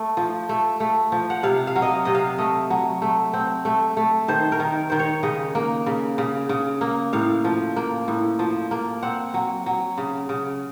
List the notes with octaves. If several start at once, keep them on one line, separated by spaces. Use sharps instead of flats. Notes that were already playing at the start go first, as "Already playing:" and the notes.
Already playing: A3
F3
A3
A3
F3
F#5
C3 F5
F5
F#3
D#5
F5
C3 D#5
F5
A3 D#5
F#3
A3
C4
A3
A3
D#3 C5
A#4
D#3
D#3 C5
C#5
C#3 D#5
A#3
C#3
C#3
C#3
A#3
A2 F5
F3
A#3
A2
F3
A#3
C4 F#5
F#3
F#3
C#3
C#3